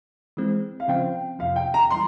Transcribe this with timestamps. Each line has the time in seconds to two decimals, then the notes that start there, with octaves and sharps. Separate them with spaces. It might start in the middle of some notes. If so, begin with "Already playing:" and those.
0.37 E3 G#3 C4
0.80 F5
0.88 C#3 F3 C4 G5
1.39 F2 C3 F3 F5
1.56 G5
1.74 A#5
1.91 E3 G3 C6